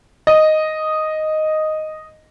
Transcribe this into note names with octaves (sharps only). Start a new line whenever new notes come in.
D#5